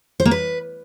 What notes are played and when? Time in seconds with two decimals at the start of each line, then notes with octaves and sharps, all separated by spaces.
0.20 C5
0.25 A#3
0.31 B4